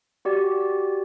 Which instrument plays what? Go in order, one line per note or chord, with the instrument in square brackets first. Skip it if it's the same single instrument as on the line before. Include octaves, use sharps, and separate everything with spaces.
[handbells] F#4 G4 D5